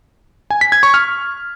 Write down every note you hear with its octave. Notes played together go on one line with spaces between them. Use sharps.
G#5
B6
G#6
C#6
F6